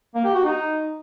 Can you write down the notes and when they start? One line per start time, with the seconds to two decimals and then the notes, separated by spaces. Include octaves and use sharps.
0.15 A#3
0.24 G4
0.34 F#4
0.44 D#4